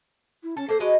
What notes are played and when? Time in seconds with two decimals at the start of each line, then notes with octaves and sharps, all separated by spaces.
0.43 E4
0.57 C#4 A4
0.69 A#3 A4 C5
0.80 G#3 F#4 B4 D#5